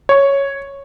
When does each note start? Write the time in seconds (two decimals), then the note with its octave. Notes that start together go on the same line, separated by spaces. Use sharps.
0.09 C#5 C#6